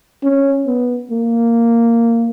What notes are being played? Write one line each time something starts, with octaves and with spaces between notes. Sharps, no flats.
C#4
B3
A#3